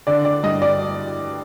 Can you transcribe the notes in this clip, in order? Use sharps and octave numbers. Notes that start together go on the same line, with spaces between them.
D3 D5
D5
G2 D#5
D5